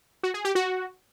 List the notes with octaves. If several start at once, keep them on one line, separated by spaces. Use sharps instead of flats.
F#4
G#4
G4
F#4